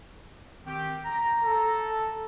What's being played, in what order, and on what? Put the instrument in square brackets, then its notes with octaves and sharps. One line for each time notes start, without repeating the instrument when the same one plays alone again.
[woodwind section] D#3 C4 G4
A#5
[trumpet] A4